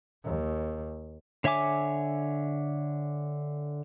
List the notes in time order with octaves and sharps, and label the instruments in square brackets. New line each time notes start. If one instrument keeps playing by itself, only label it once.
[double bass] D#2
[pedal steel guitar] D3 C#5 E5 G#5 D6